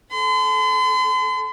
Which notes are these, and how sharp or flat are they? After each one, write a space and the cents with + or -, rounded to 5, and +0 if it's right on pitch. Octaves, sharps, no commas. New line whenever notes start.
A4 -25 C6 -45